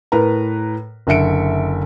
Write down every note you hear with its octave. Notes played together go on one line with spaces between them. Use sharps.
A2 A#4 B4 A#5
F#1 D3 E5 C#7 D7